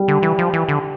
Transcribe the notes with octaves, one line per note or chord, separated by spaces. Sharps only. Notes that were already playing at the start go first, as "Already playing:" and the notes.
Already playing: G3
D3
E3
F3
E3
D3